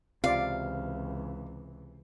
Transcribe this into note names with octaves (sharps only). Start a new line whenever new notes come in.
C#2 C3 E3 F4 D5 F5